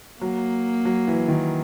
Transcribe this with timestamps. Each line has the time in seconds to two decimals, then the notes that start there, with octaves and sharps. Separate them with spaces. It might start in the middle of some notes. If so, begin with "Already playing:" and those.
0.21 F#3 A#3
0.85 F#3
1.08 E3
1.28 D#3